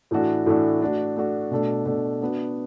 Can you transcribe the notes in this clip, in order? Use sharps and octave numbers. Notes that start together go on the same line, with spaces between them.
A2 E3 A3 D4 F#4
A2 E3 A3 D4 F#4
A3 D4 F#4
A3 D4 F#4
B2 A3 D4
B2 A3 D4
B3 D4 F#4